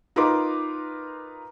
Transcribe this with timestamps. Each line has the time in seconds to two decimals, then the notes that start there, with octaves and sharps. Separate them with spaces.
0.16 D#4 F4 A#4 B4 C6 D6